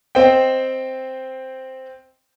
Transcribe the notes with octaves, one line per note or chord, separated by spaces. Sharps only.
C4 C5 D#5 G5